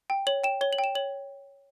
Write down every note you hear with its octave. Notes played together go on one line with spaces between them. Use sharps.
G5
C#5 F#7
G5 E7
C#5 G7
F#7
G5
E7
C#5 F#7